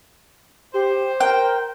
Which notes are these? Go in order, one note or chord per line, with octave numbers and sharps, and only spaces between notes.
G4 C5
A#4 G5